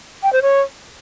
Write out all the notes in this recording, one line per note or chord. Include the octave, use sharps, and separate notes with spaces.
G5
C5
C#5